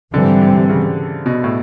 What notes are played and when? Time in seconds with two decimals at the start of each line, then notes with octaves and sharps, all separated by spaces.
0.13 G#2 D3 E3 G3 C4
0.42 C3
0.69 C#3
1.26 B2
1.44 A2